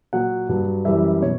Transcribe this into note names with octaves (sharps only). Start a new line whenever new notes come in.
A#2 F#3 F#5
G2 F#3
F#2 E3 G3 E5
B2 C#5